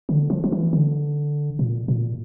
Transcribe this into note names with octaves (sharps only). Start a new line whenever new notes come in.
D3
F3
F3
E3
D3
A#2
A#2